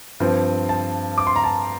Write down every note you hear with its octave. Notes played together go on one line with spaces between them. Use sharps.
G2 F3 C4
A5
D6
C6
A#5
A5